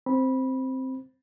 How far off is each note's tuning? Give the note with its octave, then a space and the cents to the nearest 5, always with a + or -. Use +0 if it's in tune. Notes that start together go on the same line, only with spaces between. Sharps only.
C4 +0 B5 -15